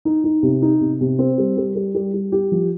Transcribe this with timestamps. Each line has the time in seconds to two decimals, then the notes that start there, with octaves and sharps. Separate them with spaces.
0.05 D#4
0.24 D#4
0.43 C3
0.62 D#4
0.81 C3
1.01 C3
1.19 C4
1.38 G3
1.57 G3
1.76 G3
1.95 G3
2.14 G3
2.32 G4
2.52 F3